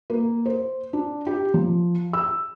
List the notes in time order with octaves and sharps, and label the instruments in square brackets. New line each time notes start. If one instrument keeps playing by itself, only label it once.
[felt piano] A#3
C5
D4
G4
F3
E6